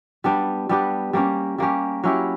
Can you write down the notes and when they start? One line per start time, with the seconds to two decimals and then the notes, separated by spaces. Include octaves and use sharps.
0.24 G3 B3 D4 G4
0.69 G3 B3 D4 G4
1.13 G3 A#3 C#4 G4
1.58 G3 A#3 C#4 G4
2.04 F#3 C#4 E4 G4